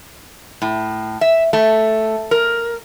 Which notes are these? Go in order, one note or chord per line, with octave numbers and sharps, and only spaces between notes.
A2
E5
A3
A#4